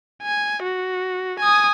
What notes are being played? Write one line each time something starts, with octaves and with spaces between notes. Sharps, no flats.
G#5
F#4
G#5 D#6